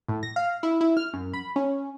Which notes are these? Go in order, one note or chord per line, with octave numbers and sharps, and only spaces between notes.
A2
A#6
F5
E4
E4
F6
F#2
B5
C#4